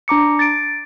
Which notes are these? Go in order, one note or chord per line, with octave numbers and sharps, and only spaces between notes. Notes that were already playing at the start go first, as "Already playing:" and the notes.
D4 A#5 D6 C#7
A6 D7